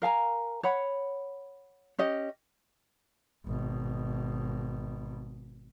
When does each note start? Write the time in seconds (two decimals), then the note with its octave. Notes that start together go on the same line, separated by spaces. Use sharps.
0.02 A#4 F5 G#5 A#5
0.63 C#5 F#5 B5
1.99 C#4 G4 D#5
3.46 G#1 B2